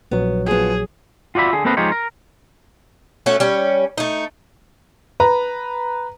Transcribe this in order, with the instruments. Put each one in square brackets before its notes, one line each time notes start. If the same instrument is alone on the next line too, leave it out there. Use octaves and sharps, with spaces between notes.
[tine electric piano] A#1 F#3 [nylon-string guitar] B3
[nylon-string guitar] F3 B3 [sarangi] G#4
[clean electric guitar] F4 F#4 D5 E5 B5
D3 G#4
A#3 C4 A4 B4 D#5 F5
F3 G#3 D#4 F4 G4 C#5
A#4
[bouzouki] A3 C#4 F#4
G3 C#4
A3 D#4
[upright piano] B4 A#5